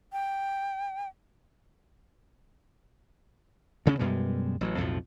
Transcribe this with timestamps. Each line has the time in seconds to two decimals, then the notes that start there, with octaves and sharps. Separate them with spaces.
0.13 G5
3.86 D2 C#3 B3 C#4
3.99 F#2 B2 G3 G#3
4.61 A1 F#3
4.77 B1 F2 A2 F3